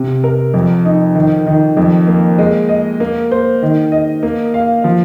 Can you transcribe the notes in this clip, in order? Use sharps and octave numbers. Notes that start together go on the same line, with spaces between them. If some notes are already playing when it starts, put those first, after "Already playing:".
Already playing: C3
A#4
F2
D#4
D#3
D#3
F2
A#3
G#3
D#5
A#3
C5
D#3
D#5
A#3
F5
F3